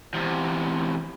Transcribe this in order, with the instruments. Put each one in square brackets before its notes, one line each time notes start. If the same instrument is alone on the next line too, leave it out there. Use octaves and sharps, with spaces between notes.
[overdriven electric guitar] E2 C3